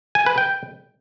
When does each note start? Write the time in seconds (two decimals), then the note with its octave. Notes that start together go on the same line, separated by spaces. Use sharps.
0.15 G#5
0.26 B4
0.38 G5